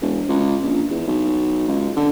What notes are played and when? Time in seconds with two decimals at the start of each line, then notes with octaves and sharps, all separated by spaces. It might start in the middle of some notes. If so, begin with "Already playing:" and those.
0.02 E1
0.29 C#2
0.63 A#1
0.91 E2
1.08 B1
1.68 C#2
1.96 D3